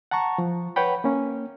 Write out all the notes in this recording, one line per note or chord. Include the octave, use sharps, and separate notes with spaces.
F#5 A5 A#5 C#6
F3
B4 C#5 F#5 G5 B5
A#3 C#4